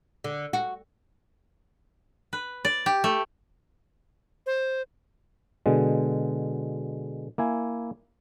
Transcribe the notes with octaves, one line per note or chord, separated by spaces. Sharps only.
D3
F#4
B4
D5
G4
A3
C5
B2 D3 G#3
A#3 E4 G#5